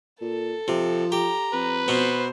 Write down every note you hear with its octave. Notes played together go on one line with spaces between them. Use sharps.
A#2 A4
C3 F3
G4 A#5
F2 B4
B2 B3 C5